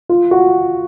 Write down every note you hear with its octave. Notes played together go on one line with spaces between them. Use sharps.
F4
F#4